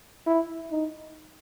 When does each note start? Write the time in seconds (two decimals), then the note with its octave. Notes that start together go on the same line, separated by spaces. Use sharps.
0.26 E4
0.71 D#4